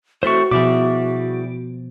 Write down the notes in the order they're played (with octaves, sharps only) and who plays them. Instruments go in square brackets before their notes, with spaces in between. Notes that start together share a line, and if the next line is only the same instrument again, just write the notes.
[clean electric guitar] E3 A3 C4 [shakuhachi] F#4 [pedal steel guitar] C5 C#6
[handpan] B2 F3 [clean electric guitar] G3 E4 G#4 [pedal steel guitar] D6